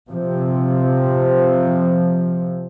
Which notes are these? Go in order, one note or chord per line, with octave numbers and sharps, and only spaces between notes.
C3 F3